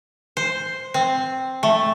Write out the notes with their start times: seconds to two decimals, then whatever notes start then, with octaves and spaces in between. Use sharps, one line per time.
0.37 C5
0.94 C4
1.63 A3